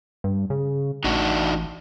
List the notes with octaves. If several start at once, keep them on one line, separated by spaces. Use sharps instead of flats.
G2
C#3
A1 D4 D#4 F#4